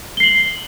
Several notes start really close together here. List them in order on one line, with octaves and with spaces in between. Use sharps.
G7 C7 F#7